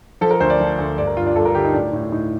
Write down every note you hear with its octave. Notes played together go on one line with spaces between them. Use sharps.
F3 A4
A#4
D2 C5
D5
F3
D2
G2 D5
A#4
G2 F4
D4
G2 A4
A#4
D3 G4
D#4
A2 D4
A2
A2 D#4